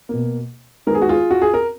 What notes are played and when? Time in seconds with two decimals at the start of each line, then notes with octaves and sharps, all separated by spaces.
0.09 B2 A#3
0.86 D#3 G#3 B3 A#4
0.95 G#4
1.02 F#4
1.09 F4 G#4
1.31 F#4
1.42 G#4
1.54 A#4